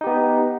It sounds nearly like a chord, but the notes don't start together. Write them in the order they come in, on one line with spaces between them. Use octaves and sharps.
D#4 G4 B3